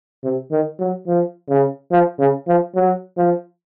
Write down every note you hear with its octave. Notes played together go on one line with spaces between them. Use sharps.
C3
D#3
F#3
F3
C#3
F3
C#3
F3
F#3
F3